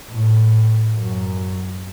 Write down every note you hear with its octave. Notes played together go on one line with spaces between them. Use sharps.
A2
F#2